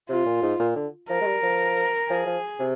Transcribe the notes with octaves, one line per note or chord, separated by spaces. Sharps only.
C3 F4
A#2
G#2
A#2
D3
F3 A#4
G#3
G3
F3
F3 G#4
F3
C3